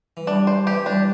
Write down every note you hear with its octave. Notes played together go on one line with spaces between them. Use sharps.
E3
G3 D4
C5
E3 G4
G3 D4